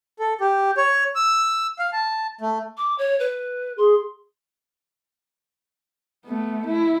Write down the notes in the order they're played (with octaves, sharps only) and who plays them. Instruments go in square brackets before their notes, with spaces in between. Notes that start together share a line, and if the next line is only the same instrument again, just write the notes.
[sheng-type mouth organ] A4
G4
C#5
E6
F5
A5
A3
[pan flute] D6
C#5
B4
[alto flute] G#4 [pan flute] C6
[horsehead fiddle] A3 B3
E4